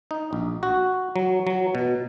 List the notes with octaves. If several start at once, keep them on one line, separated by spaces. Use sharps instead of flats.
D#4
A#1
F#4
F#3
F#3
B2